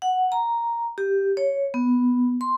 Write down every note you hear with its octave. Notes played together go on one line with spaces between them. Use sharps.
F#5
A#5
G4
C#5
B3
C6